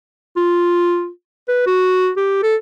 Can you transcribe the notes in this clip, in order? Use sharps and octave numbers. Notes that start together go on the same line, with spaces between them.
F4
B4
F#4
G4
A4